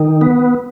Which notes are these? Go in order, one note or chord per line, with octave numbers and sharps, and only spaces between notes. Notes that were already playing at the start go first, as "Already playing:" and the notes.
Already playing: D#3
B3